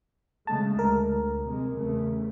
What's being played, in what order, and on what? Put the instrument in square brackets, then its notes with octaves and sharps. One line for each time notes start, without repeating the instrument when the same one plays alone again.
[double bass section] C#3 G#3 A3 [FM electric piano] A5
[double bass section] D2 [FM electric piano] A#4
[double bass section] C3 G#3
E2 C#3 A3